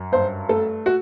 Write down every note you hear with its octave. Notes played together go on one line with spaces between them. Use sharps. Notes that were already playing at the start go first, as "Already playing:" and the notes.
Already playing: F#2
G2 C5
A3 A4
F#4